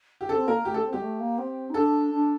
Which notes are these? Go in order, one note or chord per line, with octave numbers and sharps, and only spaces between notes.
G4
C4 A4
A#3 A#4
A3 G4
A4
C4
G3 G4
A3
A#3
C4
D#4
D4 A4
D4